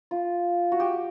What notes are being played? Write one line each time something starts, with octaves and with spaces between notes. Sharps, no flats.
F4
F#4
G4